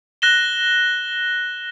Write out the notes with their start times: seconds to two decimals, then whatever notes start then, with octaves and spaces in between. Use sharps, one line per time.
0.22 F#6 A#6 E7 G7